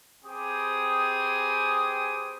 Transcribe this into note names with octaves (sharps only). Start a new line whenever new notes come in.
C4 G4 G#4 B4 G#5 D#6